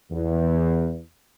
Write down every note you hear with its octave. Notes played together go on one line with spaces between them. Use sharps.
E2